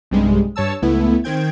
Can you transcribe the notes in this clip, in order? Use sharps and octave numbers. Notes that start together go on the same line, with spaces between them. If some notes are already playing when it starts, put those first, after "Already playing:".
B1 G2 C3 G3 G#3
G2 C#5 A5 E6
C#2 A3 B3 E4
D#3 C4 G5 G#6